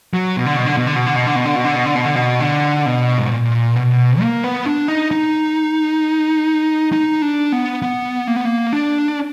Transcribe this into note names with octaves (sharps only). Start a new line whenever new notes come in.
F#3
B2
D3
B2
D3
B2
D3
B2
D3
B2
D3
B2
D3
B2
D3
B2
D3
B2
D3
B2
D3
B2
G#2
A#2
B2
A#3
B3
D4
D#4
D#4
D#4
D4
B3
B3
A#3
B3
A#3
D4